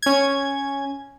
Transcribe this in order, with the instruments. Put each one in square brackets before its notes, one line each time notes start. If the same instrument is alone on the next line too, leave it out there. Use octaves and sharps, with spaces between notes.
[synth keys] C#4 G#6